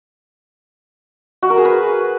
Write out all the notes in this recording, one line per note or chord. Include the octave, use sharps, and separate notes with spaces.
F#4
A#4
G#4
B4